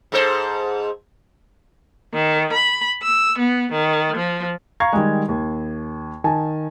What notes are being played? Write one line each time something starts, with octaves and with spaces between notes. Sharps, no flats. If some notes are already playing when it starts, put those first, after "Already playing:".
G#2 A4 C5
D#3
B5
E6
B3
D#3
F3
F5 A#5 C#6 G#6
D#3 G3 G#3
D#2
D#3 G#5 A5